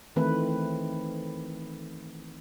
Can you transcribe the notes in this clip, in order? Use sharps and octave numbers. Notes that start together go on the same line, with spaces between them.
D#3 E3 A3 C4 B4